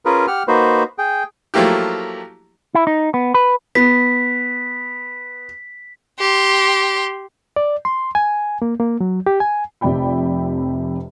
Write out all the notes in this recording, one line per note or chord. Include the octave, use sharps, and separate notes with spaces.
C#4 F4 G#4 A#4 B4
G4 F#5 F6
A#3 D#4 F#4 B4 C5
G#4 G5
F3 F#3 A3 A#3 E4 G4
E4
D#4
B3
B4
B3 B6
G4 C6
D5
C6
G#5
A#3
A#3
F#3
G4
G#5
F1 F2 C3 D5 G5 B5